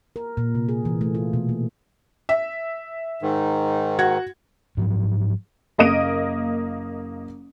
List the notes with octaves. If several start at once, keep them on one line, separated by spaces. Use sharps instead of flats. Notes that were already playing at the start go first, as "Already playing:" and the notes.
A#4
A#2
C3
G#4
E3
A3
F4
B2
A#3
E5
G#2 D#3
F#4 F#5 G#6
G#2 F3 F#3
F#1 A#3 D#5 D#6 D7 D#7